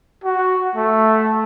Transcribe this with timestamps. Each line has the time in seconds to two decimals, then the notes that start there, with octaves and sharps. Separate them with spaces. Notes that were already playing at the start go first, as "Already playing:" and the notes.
0.24 F#4
0.75 A3